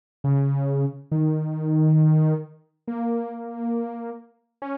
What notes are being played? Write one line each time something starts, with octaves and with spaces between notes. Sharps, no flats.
C#3
D#3
A#3
C#4